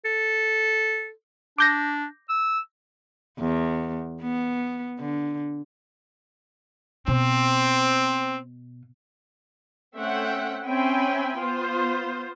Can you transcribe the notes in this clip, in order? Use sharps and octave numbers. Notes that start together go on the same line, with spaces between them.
A4
D4 D6 G6 A#6
E6
E2
B3
D3
B2 C4
A3 C4 C#4 E5 F#5 G5
C4 C#4 E5 G5 G#5 B5
B3 F4 C5